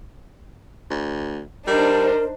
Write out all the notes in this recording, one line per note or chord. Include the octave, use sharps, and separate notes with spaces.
D2
G3 D4 D#4 A#4 C5